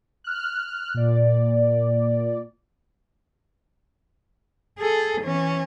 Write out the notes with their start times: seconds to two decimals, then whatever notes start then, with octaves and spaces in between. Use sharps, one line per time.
0.24 F6 F#6
0.94 A#2 D5
4.79 G#4 A4
5.21 E3 C#4